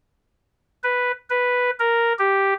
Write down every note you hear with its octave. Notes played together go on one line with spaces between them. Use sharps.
B4
B4
A#4
G4